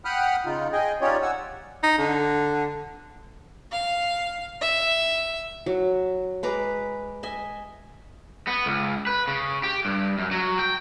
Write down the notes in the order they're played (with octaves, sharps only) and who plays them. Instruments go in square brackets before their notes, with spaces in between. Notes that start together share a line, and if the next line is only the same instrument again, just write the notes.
[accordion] F#5 G5 B5 D#6 F6 F#6
C#3 D#4 F4
G#4 D#5 G5 G#5
C#4 D#4 F4 G4 C#5 D5
F#5 G#5 E6
[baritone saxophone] D#4
D3
[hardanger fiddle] F5
E5
[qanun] F#3
G#3 B4 A#5 D6
D#5 E5 G#5
[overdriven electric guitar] B3
C#2
B4
C#3
G4
G2
F#2
F#3
G5